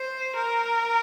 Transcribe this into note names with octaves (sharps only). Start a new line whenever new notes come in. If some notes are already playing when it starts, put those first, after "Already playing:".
Already playing: C5
A#4